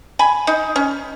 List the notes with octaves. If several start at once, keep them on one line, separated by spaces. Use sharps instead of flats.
G#5 B5
D#4
C#4